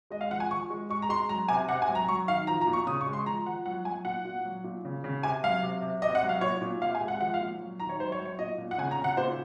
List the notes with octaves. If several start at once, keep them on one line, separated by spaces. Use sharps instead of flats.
G#3 D#5
F5
F3 F#5
G#5
F3 C#6
G#3
G#3 C#6
A#5
G#3 C6
F#3 A#5
C3 G#5
C3 F#5
G#5
F#3
A#5
F#3 C#6
D#3 F5
F3 A#5
A#5
A#2
C#6
C#3 D#6
C#6
G#3
C6
F3 A#5
F3 F#5
F#3 F#5
F#3 G#5
A#2 F#5
A#2
F#3
A#2
C#3
C#3
C3 G#5
F#3 F5
C3
C3
C3 D#5
F#5
F#3
F5
A#2 C#5
A#2
C3 F5
G#5
G#3
F#5
F3 F#5
F5
A#2
F#3
D#3 A#5
C#5
F#3 C5
C#5
F#3
C#5
A#2 D#5
A#2
F#5
C#3 G#5
A#5
C#3
F#5
A#2 C5